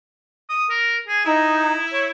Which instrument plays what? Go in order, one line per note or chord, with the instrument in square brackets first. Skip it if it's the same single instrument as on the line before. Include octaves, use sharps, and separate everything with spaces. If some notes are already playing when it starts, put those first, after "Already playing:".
[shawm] D#6
A#4
G#4
[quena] D#4 [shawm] E4
[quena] C#5